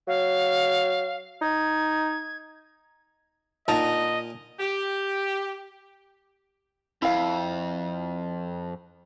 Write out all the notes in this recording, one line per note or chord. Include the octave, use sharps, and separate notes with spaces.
F#3 F5
D#4 G#6
A#2 D3 D#4 D#5 A5 A#5
G4
F2 E4 F5